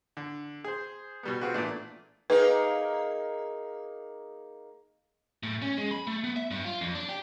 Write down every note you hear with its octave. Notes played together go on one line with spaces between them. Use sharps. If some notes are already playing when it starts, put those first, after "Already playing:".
D3
G#4 C5
B2 G3 B3
C4 F4 F#4 G#4 B4
A#2 E3 A3 D4
A#3 D#4 G#4 B4
A2
C#4
G#3
B5
A3
B3
E5
G2
F4
F2
D4
G4